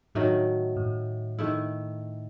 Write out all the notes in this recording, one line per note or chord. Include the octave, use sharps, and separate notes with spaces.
A2 D#3 F#3 A3
A2
D#3 A3 E4